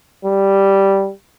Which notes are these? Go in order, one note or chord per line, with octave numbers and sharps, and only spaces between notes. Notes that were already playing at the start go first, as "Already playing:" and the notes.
G3